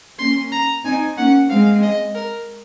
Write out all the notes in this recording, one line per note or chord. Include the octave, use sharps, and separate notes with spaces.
A#3 C#4 C6
A#5
C4 D#4 G#5
A#3 C#4 F#5
G#3 C4 F5
D#5
A#4